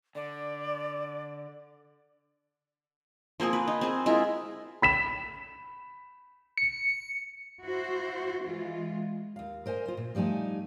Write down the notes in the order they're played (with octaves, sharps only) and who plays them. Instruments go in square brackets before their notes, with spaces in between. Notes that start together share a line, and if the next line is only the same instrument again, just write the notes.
[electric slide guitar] D3 [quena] D5
[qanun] F3 A#3 C4 G#4
B4
D#4
C4 G#4
G#3 E4 F4 A#4
[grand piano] B5 B6 E7
[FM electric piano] C#7
[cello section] E4 F#4 C5
E3 G#3 F4
[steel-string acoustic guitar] D#2 F5
A#4 C5 D#5 G#5
F4 C5
A#2
F3 G3 A3 D#4 G#5